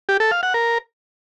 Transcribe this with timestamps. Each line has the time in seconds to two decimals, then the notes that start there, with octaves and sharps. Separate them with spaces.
0.09 G4
0.20 A4
0.31 F5
0.43 F#5
0.54 A#4